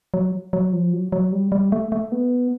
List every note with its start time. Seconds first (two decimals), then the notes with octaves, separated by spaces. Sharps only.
0.14 F#3
0.53 F#3
0.73 F3
0.93 F#3
1.12 F#3
1.32 G3
1.52 G3
1.72 A3
1.92 A3
2.12 B3